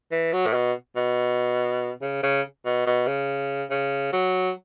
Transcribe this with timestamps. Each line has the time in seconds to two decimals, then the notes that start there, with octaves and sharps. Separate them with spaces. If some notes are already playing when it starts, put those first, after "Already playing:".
0.11 E3
0.33 F#3
0.46 A2
0.53 B2
0.96 B2
2.02 C#3
2.23 C#3
2.65 B2
2.86 B2
3.07 C#3
3.70 C#3
4.13 F#3